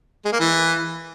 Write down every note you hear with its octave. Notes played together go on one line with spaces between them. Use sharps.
G#3
A#3
E3